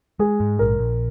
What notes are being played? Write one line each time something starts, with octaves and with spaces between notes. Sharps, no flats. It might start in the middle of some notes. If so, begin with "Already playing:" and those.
G#3 G#4
G#2
A#1 A#4
A#1